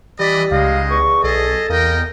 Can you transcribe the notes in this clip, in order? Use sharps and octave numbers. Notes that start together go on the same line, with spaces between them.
E3 G3 D5 D#5 B5
C#2 G#3 D#4 D#5 F5
E2 C#6
B1 G#4 A4 D#5 A5
E2 A#3 A#4 D#5 G5